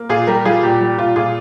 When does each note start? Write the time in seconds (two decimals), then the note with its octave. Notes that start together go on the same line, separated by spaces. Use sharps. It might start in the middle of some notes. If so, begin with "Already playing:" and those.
Already playing: A#3
0.09 A#2 F4 G#4
0.27 G3 G4 A#4
0.45 G3 F4 G#4
0.63 A#2 G4
0.81 G3 G4
0.98 A#2 F4
1.16 A#2 F4 G#4